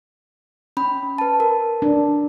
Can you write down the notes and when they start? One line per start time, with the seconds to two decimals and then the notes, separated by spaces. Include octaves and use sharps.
0.77 C#4 B5
1.18 B4 A5
1.40 A#4
1.82 D4